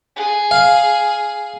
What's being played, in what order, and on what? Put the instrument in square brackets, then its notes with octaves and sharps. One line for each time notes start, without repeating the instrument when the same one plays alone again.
[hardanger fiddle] G#4
[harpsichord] F5